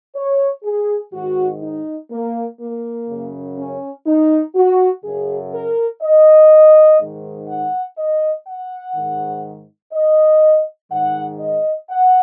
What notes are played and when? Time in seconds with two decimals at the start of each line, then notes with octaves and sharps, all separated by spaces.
0.15 C#5
0.64 G#4
1.13 G#2 D#3 F#4
1.62 D#4
2.11 A#3
2.60 A#3
3.08 F#2 C#3
3.58 C#4
4.06 D#4
4.55 F#4
5.04 F#2 C#3 G#4
5.53 A#4
6.02 D#5
7.00 G#2 D#3
7.49 F#5
7.98 D#5
8.47 F#5
8.95 G#2 D#3
9.93 D#5
10.91 G#2 D#3 F#5
11.40 D#5
11.89 F#5